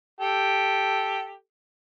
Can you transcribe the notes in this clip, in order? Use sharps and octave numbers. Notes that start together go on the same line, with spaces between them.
G4 A4